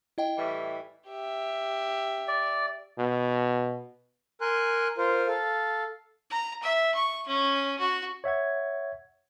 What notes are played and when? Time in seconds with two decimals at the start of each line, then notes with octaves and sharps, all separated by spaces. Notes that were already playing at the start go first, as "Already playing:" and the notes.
0.18 E4 D#5 G5
0.38 A2 E3 G3
1.07 G4 E5
2.28 D5
2.99 B2
4.41 A#4 G#5 C6 F#6
4.98 F4 A#4 C5
5.28 A4 F5
6.30 A#5
6.62 E5
6.95 C#6
7.27 C#4
7.79 F#4
8.24 C#5 E5 F#5 G#6